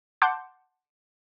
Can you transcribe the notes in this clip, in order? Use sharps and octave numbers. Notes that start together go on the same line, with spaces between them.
F#5 A5 C6 D6 G6